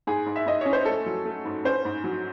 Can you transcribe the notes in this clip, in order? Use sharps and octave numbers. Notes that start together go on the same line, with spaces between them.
G#2 G#4
G#2
E5
G#2 D#5
C#4 C#5
C5
A3 A4
F#3
A3
G#2
C#4 C5
G#2
F#3